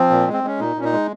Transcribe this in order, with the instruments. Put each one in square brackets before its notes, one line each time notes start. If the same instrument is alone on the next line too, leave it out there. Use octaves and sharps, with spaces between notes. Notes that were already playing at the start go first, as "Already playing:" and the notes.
Already playing: [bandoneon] F3 C4
A#2
G#3
C4
G#3 C#4
A#2 D#4
A#2 C#4
D#4
G#3